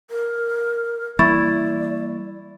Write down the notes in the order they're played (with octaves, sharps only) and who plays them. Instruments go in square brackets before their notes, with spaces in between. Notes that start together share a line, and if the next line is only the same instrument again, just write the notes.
[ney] A#4
[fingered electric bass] E3 G3 A#3 [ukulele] E4 [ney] D5 [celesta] B5 C#6 A6